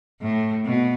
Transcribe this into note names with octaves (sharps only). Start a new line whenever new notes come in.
A2
B2